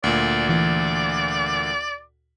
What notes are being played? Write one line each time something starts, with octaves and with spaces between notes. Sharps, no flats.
D2 A#2 D5
E3 D5